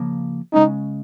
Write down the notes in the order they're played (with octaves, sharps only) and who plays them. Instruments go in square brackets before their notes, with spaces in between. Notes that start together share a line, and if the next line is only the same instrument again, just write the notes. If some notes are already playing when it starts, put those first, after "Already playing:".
Already playing: [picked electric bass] C#3 F3 A#3
[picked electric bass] C#3 G#3 C#4 [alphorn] D#4